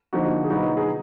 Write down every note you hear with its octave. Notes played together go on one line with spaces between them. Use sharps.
D3 F3 A#3 D#4 F#4
G#4
B2 F#3 B3 D#4 F#4
G#4